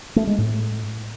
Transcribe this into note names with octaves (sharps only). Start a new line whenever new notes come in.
A3
G#3
A2